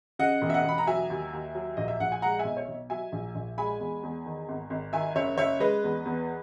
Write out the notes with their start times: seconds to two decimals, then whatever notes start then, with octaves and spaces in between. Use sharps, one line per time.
0.19 C#3 D#5 F#5
0.42 E1
0.50 E5
0.53 D#5 F#5
0.65 E1 B5
0.78 A#5
0.87 F#3 E5 G#5
1.10 D#2
1.33 D#2
1.55 F#3
1.77 A#1 D#5
1.88 E5
2.00 A#1 F#5
2.12 G#5
2.22 G#3 F#5 A#5
2.39 E5 G#5
2.45 B1
2.56 C#5 E5
2.68 B1
2.90 F#3 E5 G#5
3.12 A#1
3.35 A#1
3.58 G#3 G#5 B5
3.80 E2
4.03 E2
4.26 D#3
4.49 G#1
4.70 G#1
4.93 D#3 E5 G#5
5.15 F#1 C#5 E5
5.38 F#1 C#5 E5
5.60 G#3 B4 D#5
5.84 E2
6.05 E2